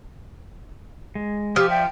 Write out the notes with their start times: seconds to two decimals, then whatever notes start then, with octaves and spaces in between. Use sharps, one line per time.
1.15 G#3
1.56 F3 G4 D#6 F6
1.70 D5 E5 G5